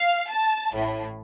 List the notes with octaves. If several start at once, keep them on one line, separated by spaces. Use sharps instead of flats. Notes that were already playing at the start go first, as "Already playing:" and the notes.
Already playing: F5
A5
A1 A2